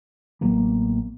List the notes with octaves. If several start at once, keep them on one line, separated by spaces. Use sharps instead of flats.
A1 F#3 A#3 B3